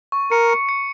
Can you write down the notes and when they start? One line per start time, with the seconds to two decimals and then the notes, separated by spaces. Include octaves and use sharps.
0.12 C#6
0.31 A#4 C#7
0.50 C#7
0.69 C#7